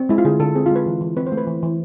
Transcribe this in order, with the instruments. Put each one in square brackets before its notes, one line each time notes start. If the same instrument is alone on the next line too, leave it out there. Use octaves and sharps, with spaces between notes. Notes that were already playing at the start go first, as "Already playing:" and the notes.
Already playing: [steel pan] C4
G#3 E4
F4
D3 G#4
D3 A4
C4 G#4
F4
G#3 B4
E3
E3
C4 B4
C5
A3
B4
E3
E3